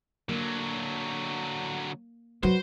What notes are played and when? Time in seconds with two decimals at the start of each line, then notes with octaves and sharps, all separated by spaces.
0.29 D3 F#3 A#3
2.43 F#3 F#4 B4 C5